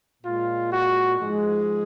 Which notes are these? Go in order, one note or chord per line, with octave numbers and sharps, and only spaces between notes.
A#2 G#3 F4
F#4
G#2 F3 G#3